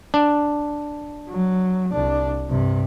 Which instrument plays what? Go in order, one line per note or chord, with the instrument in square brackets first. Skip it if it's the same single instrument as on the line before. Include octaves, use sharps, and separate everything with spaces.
[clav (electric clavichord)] D4
[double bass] F#3
C2 D4
G2 C3